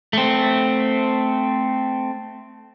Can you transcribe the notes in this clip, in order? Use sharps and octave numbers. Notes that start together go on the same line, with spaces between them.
A3 C4